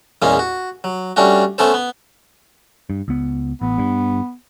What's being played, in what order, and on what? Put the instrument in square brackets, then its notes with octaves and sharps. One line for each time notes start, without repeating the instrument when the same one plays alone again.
[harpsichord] E2 A#2 G#3 A#3 C#4
F#4
F#3
G3 A3 C#4 D4 F#4
A3 B3 C#4 A4 C5
B3
[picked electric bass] G2
C#2 B3
[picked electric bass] A1 [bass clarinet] B3
[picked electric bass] G2